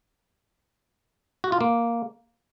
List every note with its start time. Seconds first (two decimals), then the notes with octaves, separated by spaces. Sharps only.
1.44 F#4
1.52 F4
1.61 A#3